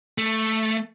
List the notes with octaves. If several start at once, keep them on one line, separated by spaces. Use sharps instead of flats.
A3